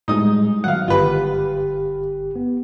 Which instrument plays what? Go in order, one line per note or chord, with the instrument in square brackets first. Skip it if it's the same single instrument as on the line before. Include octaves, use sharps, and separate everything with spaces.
[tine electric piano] A2 G3 G#3 [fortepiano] D#4 D#6
[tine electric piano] D#3 F#3 [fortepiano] F5 F#5
[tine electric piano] G1 G4 [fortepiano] F4 B4
[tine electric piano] B3